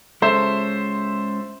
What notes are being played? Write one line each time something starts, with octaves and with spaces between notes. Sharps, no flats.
G#3 C#4 A4 C5 E5